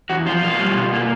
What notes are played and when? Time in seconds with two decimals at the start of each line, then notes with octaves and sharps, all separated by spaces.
0.10 E2 F#4
0.26 F3 F4
0.42 B2 F4
0.59 G3
0.76 B2
0.93 A#3